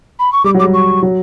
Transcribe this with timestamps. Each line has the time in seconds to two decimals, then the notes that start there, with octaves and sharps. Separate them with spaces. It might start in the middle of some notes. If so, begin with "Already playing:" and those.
0.19 B5
0.32 C#6
0.44 G3 D6
0.55 F#3
0.59 D6
0.64 G3
0.74 C#6
1.03 F#3